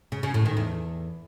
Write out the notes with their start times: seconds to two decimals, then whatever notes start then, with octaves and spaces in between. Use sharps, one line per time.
0.12 C#3
0.23 C#3
0.34 A2
0.45 D#3
0.57 E2